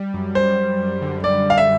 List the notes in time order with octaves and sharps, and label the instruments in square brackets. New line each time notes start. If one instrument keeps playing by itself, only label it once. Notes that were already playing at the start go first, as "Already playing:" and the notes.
Already playing: [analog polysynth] G3
F#2
[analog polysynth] F#2 [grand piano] C5
[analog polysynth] F#2
F#2
D3
[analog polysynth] F#2 [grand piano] D5
[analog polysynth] G3 [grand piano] F5
[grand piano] E5